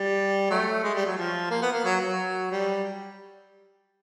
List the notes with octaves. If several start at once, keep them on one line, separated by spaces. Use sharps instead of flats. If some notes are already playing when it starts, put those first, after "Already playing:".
Already playing: G3
F#3 A3
G#3
G3
F#3
F3
A#3
B3
A#3
F#3
F#3
G3